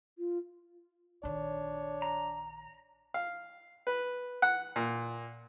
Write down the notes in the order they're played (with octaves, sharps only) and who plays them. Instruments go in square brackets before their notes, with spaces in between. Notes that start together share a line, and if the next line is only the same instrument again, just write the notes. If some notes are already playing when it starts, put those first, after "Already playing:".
[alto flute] F4
[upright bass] A#1 D#3 [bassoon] D4 [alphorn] C#5
[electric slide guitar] A#5
[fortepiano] F5
B4
F#5
A#2